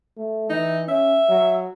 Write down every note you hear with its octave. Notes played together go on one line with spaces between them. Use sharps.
A3
E3 D#4
C#4 E5
F#3